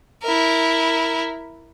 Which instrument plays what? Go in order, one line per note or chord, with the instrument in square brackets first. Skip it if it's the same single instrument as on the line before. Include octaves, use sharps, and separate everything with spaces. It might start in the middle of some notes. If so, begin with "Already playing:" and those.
[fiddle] E4 A#4